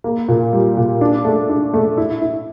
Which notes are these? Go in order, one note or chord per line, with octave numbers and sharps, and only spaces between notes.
A#3
A#2
G3
A#2
D4
A3
D4
A3
E4
E4